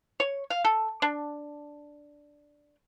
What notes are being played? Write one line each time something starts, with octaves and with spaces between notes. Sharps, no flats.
C#5
F5
A4
D4